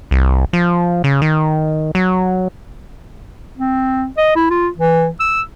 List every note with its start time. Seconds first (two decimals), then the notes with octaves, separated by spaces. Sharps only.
0.11 C2
0.53 F3
1.04 C#3
1.22 D#3
1.95 F#3
3.58 C4
4.18 D#5
4.36 E4
4.50 F4
4.78 E3
5.20 E6